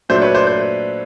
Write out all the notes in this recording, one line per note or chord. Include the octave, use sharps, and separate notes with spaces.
A#2 F#3 A3 D4 C5
B4 C#5
C5 D5
C5
C5